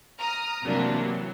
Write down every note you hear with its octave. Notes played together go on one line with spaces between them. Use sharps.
A#5 D#6 F6
C3 E3 F#3 G3 A#3 D4
E3 F#3